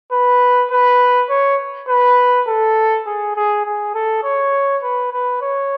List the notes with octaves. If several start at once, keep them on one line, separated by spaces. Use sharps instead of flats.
B4
B4
C#5
B4
A4
G#4
G#4
G#4
A4
C#5
B4
B4
C#5